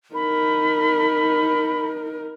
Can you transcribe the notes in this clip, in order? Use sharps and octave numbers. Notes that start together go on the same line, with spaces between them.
D#4 A#4 B5